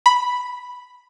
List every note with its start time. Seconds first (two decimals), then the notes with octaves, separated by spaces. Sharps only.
0.06 B5